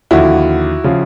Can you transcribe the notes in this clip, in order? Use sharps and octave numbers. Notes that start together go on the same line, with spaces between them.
D#2 D3 F3 E4 F#4
C#3 F3